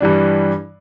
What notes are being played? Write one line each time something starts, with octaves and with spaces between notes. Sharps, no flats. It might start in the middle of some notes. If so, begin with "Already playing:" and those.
G2 E3 G3 D4